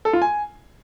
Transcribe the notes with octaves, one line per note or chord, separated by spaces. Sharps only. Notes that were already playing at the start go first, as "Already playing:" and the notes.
A4
F4
G#5